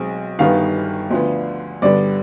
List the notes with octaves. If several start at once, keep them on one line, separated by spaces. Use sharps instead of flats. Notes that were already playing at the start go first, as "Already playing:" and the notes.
Already playing: B1 G#3 C4
G1 G2 D#3 G3 B3 F5
D2 D3 F3 B3
G2 D3 G3 B3 D5